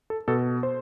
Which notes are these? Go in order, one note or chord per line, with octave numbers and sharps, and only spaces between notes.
A4
B2 A4
C5